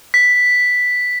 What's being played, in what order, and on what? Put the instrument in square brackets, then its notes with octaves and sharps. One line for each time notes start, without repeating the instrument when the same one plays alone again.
[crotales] B6